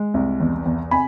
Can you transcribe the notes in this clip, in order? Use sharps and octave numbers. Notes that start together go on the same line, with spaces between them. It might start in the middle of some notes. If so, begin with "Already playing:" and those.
Already playing: G#3
C2
E2
E2
C3 G#5 B5